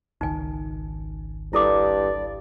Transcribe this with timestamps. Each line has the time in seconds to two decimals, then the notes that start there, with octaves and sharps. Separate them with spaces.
0.21 G#1 C#2 D#3 D#4 G#5
1.53 G2 E4 A4 D5 D6